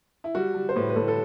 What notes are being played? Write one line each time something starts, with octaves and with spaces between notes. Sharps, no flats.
E4
G3 F#4
G3
C5
A2 B4
B4
A2 A4
A4